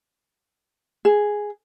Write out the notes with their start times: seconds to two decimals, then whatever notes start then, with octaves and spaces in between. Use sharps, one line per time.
1.05 G#4